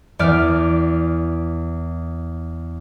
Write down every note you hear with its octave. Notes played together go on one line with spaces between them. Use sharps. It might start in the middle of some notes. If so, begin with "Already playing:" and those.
E2 D5 F6